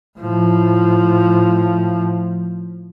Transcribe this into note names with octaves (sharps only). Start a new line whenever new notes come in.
A2 F3